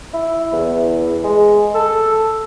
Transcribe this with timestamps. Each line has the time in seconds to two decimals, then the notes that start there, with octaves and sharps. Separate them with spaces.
0.14 E4
0.53 E2
1.24 G#3
1.75 A4